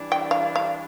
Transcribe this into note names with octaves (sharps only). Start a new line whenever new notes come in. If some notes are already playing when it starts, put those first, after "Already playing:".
Already playing: E3 G3 D4
G5
F5
F5